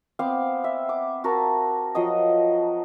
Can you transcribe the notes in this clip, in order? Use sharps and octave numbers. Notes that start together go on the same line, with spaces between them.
B3 C4 F5 D6
E5
D6
F#4 A#4 A5
F3 F#3 D#5 D#6